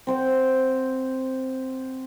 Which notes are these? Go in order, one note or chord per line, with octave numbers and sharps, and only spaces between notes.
C4 C5 F#5